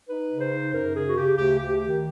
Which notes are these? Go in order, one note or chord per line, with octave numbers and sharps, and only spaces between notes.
D#4 B4
C#3
C5
D#4
F#2 A#4
C#3 G#4
F#4
C#3 G4
D2 G4
D2 G4
D#3 G4